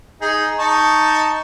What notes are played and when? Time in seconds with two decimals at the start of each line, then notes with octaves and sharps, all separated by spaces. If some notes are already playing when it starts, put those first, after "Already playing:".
0.21 D#4 G#4
0.59 D#4 A5 C#6